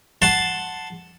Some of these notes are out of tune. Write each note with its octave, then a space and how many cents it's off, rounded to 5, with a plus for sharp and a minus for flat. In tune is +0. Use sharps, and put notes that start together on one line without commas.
F#5 +0 A5 +0 C6 +0